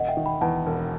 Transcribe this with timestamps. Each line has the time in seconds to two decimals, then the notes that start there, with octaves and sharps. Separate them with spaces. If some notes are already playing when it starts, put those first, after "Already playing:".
Already playing: E1 D#5 F#5
0.08 E5 G5
0.17 D#3
0.26 G5 B5
0.41 E2 F#5 A5
0.66 E1